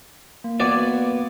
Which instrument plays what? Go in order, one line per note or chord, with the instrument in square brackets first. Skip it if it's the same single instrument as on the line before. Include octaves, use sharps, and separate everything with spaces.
[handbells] A#3
[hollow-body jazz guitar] B3 F#4 [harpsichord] D5 G#5